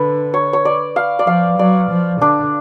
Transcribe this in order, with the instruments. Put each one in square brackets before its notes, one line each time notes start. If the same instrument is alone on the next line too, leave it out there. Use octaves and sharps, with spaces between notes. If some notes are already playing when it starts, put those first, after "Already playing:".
Already playing: [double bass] D3 [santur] B4
[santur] C#5
C#5
D5
F5
D5
[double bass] F3 [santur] F5
[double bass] F#3 [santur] D5
[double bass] F3
[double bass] D3 [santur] D4